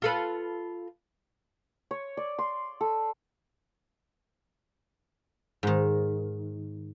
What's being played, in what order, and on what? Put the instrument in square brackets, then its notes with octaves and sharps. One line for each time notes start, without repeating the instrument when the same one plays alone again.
[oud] F4 A4 B4
[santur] C#5
D5
C6
A4
[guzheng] G#2 D#3